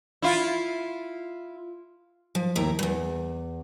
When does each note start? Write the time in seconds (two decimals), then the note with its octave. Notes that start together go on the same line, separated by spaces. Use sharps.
0.22 E4 F4
2.35 F3
2.55 D#2 A2 E5 A#5
2.79 E2 G2